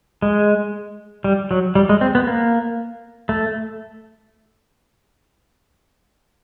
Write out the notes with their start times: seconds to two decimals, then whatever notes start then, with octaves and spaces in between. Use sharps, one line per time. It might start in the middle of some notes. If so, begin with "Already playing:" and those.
0.22 G#3
1.24 G3
1.51 F#3
1.75 G3
1.89 G#3
2.01 C4
2.15 B3
2.27 A#3
3.29 A3